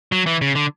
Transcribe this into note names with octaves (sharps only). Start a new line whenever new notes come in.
F#3
E3
C#3
D3